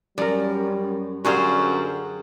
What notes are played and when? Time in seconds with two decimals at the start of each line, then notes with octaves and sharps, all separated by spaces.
0.18 F#2 G3 A#4 D5
1.25 F#2 D3 G3 F#4 G#4 C5 F5